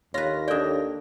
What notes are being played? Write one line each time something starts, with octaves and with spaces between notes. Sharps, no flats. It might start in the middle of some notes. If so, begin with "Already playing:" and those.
D#2 F4 B4 C#5 A#6
D4 A4 D5 G5